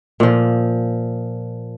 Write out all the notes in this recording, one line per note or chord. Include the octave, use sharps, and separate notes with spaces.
A#2 F3